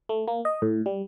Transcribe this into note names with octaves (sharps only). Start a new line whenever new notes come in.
A3
A#3
D#5
A2
G3